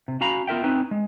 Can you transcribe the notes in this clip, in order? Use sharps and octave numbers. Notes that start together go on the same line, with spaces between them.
C3
C#4 F#4 F5 A#5 B5
B3 F4 A#4 E5 G5
C4 C#4 D#4 B4
G#3